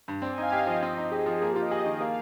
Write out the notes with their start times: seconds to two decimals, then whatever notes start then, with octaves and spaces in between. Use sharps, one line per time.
0.08 G2
0.22 C4 D5
0.33 G#5
0.38 D#4 F5
0.52 G4 D#5
0.67 F3
0.83 C4
0.97 D#4
1.11 G4 G#4
1.26 F3
1.41 A#3 G#4
1.51 G4
1.56 F4
1.62 D#5
1.71 G#4
1.86 D#3
2.00 A#3 F5